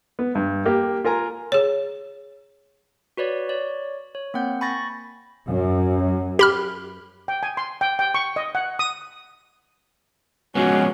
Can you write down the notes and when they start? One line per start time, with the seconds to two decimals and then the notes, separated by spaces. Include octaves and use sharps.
0.19 B3
0.35 G2
0.65 A#3 G4
1.04 F4 A#4 G#5 A#5
1.52 G#4 C#5
3.17 F#4 B4 C#5 D5
3.49 C#5 D5
4.15 C#5
4.34 A#3 C4 F#5 G6
4.61 G#5 B5 C#6 A6 A#6
5.48 F#2
6.39 G4 B5 F6
7.28 G5
7.43 G#5
7.57 C6
7.81 G5
7.99 G5
8.15 C#6
8.36 D#5
8.55 F#5
8.79 D#6
10.55 F3 G#3 B3 C#4 F#4